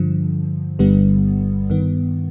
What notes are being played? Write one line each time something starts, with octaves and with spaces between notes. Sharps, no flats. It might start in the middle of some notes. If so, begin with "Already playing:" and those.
Already playing: G2 D3 F3
G1 G2 D3 G3 B3
G2 D#3 B3